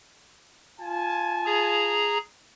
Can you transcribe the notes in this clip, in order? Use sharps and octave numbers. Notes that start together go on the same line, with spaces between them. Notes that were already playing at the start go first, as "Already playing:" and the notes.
F4 G#5 A5
G#4 A#5